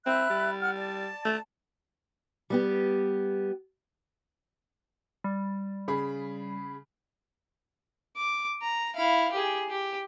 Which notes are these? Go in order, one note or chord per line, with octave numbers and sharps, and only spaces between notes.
C4 E5 B5 F#6
G3
F#5 F6
D5 A5
A3
G3 B3 G4
G3
C#3 G#4 B5
D6
A#5
E4 F5
G4 G#4
G4